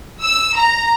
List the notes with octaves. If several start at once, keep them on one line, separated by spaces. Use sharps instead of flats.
E6
A#5